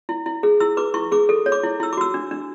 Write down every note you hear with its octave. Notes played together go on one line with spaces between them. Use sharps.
E4
E4
G#4
E4 E6
B4 D6
E4 C#6
G#4 D6
A4
C#5
D6
E4
E4 E6
D6
F#4 E6
D4
D4